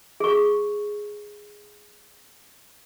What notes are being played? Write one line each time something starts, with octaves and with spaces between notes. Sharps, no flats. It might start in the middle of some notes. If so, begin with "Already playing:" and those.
G#4 C#6